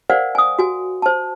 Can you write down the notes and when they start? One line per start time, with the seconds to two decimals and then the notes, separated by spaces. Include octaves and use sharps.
0.10 A#4 C5 D5 F5 F#5 G#5
0.35 G#5 D#6
0.59 F#4 G#5
1.02 C5 A5